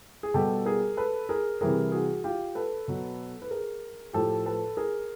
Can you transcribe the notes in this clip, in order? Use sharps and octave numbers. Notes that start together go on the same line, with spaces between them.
G#4
B2 G3 G4 A4
G#4 A#4
A4 B4
G#4 A#4
C3 E3 G3 G#4 A#4
F#4 G#4
F4 G4
A4 B4
B2 F#3
B4
G#4 A#4
A2 F3 G4 A4
A4 B4
G#4 A#4